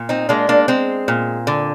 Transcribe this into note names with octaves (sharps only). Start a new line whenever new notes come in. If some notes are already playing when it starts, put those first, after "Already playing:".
Already playing: A#2
C4 D#4
G#3 A#3 D4
A#3 D4
G#3 C4
A#2
D3